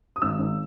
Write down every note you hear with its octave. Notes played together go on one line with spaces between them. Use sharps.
D#6
G#1 E6
G#1